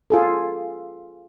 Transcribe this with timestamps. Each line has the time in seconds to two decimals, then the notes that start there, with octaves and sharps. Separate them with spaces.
0.10 F4 G#4 A4